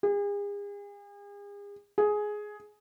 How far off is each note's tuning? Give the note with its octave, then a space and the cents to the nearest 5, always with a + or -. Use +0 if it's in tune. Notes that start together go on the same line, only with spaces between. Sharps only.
G#4 -40
G#4 +10